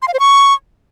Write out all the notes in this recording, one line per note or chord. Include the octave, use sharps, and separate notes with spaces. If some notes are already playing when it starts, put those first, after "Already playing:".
C6
F5
C5
C#6